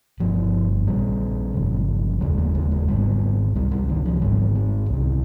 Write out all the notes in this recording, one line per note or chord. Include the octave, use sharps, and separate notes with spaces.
G1 G2 F3
A#1 A#2 G3
G1 F2 C#3
F1 D#2 C#3 G#3
A#3
G#3
G#3
G#1 G#2 G3
C#2 C3 G3
G3
D#3
F3
G#1 G#2 G3
G#3
C2 C3